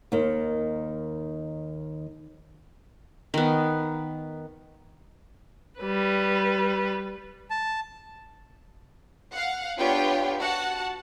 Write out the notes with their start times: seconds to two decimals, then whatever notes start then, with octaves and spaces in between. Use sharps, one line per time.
0.12 D#2 D#3
3.34 D#3 B3
5.80 G3 B4
7.50 A5
9.32 F5 F#5
9.78 B3 D4 F4 G4 C#5 G5
10.39 F#4 F#5 A5